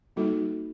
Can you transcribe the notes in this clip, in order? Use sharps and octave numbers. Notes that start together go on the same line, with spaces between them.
G3 A#3 D#4 F#4 A4